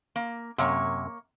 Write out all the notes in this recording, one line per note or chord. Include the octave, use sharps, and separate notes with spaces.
A#3
F#2 C3 A#3 C#5